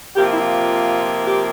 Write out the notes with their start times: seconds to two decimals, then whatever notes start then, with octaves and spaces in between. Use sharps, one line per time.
0.16 C3 F3 A#3 G4
0.25 F4
0.32 E4
0.39 F4
1.26 G4